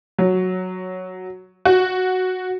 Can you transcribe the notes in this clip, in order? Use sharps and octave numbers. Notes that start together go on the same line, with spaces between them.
F#3
F#4